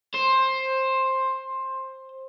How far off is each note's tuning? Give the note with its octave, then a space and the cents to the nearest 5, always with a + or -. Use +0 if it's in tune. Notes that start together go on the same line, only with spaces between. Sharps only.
C5 +15